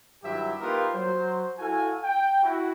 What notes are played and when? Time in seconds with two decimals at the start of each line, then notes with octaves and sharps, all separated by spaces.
0.24 G2 D#3 F#3 E4 G4 E5
0.61 A#3 D#4 F4 G4 A#4 B4
0.93 F#3 C5
1.59 E4 F#4 A4 F5 G#5
2.04 G5
2.43 E4 F#4